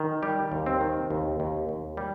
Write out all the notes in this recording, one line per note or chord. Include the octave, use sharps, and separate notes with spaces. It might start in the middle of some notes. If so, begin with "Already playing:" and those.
Already playing: D#3
G3 G4
D#2
C4
D#3
D#2
D#2
D#2
G3